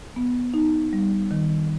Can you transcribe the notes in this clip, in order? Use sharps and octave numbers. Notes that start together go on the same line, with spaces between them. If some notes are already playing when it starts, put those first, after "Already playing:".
B3
D#4
G3
D#3